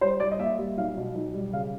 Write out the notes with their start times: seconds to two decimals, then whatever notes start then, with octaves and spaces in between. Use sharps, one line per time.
0.01 G3 C5
0.20 G3 D5
0.31 D#5
0.39 A#3 E5
0.58 G3
0.78 B1 F5
0.97 B2
1.15 B1
1.34 G3
1.53 C#3 F5